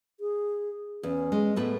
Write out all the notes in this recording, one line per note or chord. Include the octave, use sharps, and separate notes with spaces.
G#4
E2 C#4
G#3
A2 A3 B3 B4